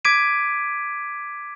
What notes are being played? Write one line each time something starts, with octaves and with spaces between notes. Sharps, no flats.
D6 G#6 B6 D7 D#7